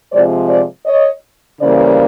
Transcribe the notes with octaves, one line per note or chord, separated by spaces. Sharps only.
C3 F3 G#3 C5 D5
C5 D5
C#5 D#5
C#3 E3 G3 A#3 C5 D5